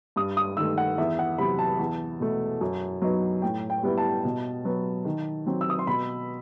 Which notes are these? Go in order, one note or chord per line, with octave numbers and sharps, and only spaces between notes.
G2 D#6
D#6
D#3 A3 E6
F#5
E2 E5
F#5
C3 F#3 B5
A5
E2
B2 A3
F#2
F#3 B3 D#4
A2 G5
G5
G3 B3 E4
A5
B2
F#3 B3
D#3
F#3 C4
E6
D#6
C6
B2 B5